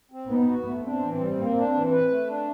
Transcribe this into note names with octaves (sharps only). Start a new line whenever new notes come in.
C4
B3 D#4
F#4
A3
C4 D4
E3
G3
A#3
D4
E3
B4
A3
D4